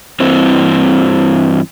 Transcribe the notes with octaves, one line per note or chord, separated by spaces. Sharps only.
G2 E3 C4